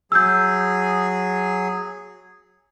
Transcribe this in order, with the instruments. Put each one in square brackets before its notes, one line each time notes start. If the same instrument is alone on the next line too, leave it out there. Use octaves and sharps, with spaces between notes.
[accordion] F#3 G#4 [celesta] E6 G6